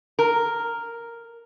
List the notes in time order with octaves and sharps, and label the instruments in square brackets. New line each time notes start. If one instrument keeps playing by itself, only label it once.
[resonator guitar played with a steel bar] A#4